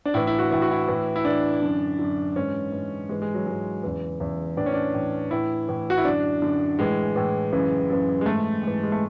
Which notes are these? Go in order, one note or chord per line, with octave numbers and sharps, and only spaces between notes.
D4
A2 E3 E4
E4
F#4
A2 E3 E4
F#4
E4
A2 E3
E4
A2 E3 D4
F#2 D3
F#2 D3
G#2 E3 C#4
G#2 E3
G#2 E3 G#3
G#3
F#3
G#2 E3 G#3
E2 C#3 E3
E2 C#3 E3
A2 E3 D4
C#4
D4
A2 E3
A2 E3 E4
A2 E3
F#4
E4
F#2 D3 D4
F#2 D3
A2 E3 G#3
A2 E3
F#2 C#3 E3
F#2 C#3 E3
G#3
G#2 E3 A3
G#2 E3
G#3
A3